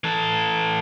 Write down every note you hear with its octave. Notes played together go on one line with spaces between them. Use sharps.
E3 A4